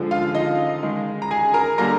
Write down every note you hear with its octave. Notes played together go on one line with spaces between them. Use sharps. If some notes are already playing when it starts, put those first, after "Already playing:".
Already playing: D3 F3 G#3
F4 F5
D#4 D#5
D#3 G#3
A#5
G#4 G#5
A#4 A#5
D3 G3 A#3 A#4 A#5